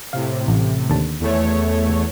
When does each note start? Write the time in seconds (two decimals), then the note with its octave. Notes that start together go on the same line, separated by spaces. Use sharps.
0.13 A2 C3 F5
0.48 A1
0.90 D#2 D3 A5
1.20 E2 A3 C#5